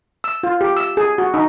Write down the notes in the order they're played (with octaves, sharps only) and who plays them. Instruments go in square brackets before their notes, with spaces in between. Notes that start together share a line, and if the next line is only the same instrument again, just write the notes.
[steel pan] E6
F4
G4
E6
G#4
F#4
D#4